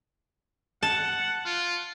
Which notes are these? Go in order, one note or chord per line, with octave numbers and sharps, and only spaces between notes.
F#5 A5
F4